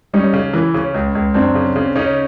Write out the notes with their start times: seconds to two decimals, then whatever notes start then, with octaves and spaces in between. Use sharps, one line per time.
0.13 G3 C#4 D#4
0.33 C#3
0.53 E3
0.74 C#3 C#4
0.94 C#2
1.15 C#2
1.34 F#2 C4 D4
1.55 C#3
1.76 C#3
1.96 C#3 C#4 D#4